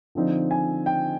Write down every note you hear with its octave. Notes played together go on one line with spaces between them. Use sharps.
D3 F3 C4 D#4
G#5
G5